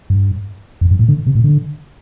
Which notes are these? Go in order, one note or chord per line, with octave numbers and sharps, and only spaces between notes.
G2
F2
G2
A2
D3
C3
A2
D3